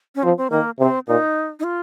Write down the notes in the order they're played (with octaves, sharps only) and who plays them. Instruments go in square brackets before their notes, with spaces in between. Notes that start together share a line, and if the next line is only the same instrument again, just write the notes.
[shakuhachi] C#4
[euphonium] F3 [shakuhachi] C4
[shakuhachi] C4
[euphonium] D#3 [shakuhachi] A#3
[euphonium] C3 [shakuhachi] C4
[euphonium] A#2 [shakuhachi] D#4
[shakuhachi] D#4
F4